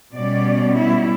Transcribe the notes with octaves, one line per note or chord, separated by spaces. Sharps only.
B2 G3 C#4 D5
E4